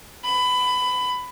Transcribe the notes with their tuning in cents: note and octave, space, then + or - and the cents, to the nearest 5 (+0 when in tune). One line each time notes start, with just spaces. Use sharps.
B5 +20